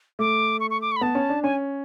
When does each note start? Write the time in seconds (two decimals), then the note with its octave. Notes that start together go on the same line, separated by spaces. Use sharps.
0.19 A3 D6
0.60 C#6
0.70 C#6
0.82 D6
0.92 C#6
0.96 B5
1.01 B3 A5
1.15 C#4
1.29 D4
1.43 C#4 G#5